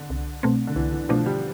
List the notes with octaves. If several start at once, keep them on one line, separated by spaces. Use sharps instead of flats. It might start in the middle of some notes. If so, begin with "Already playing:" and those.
Already playing: D3
C2
B2 A3 C4
D3
C2 E3
E3
B2 F3 A3 D4
G3